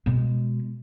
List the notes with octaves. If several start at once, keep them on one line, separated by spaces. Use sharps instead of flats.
B2 G#3